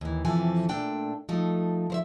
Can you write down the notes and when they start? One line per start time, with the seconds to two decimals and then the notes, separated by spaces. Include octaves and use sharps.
0.01 D#2 E3
0.25 F2 C3 E3 F3 A4 G#5
0.69 A#2 A3 D4 G5
1.29 F3 A3 D#4
1.90 F3 C5 E5